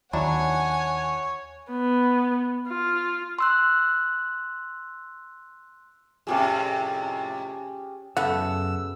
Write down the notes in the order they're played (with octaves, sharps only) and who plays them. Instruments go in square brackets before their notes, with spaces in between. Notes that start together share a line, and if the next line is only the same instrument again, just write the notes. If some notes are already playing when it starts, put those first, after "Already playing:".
[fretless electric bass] D#2 [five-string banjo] F#3 D4 E4 [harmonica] C#5 [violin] F#5 G#5
[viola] B3
F4
[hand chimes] C6 E6 F#6
[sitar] F2 A2 C3 [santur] C#4 G4 G#4
[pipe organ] F#2 E6 [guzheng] C#3 A3 B3 [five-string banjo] F#5